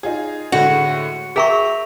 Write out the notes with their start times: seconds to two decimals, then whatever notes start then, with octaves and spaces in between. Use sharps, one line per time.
0.03 D#4 F4 G#4
0.52 A2 D3 G#3 F#4
1.36 G#4 A#4 E5 G5 A#5 C#6